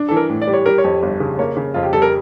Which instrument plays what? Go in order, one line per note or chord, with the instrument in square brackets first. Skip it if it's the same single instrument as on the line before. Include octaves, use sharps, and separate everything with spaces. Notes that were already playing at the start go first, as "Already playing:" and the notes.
Already playing: [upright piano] D4
[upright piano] E3 [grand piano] A4
[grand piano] A#4
[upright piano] A2
[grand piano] D5
[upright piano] G3
[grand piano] C#5
[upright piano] G3 [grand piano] A#4
[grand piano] C#5
[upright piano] F2
G1
C#3
[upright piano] A#3 [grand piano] C#5
[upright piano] C#3
[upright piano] F2 [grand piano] F4
[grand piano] G4
[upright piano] G3 [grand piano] A4
[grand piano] A#4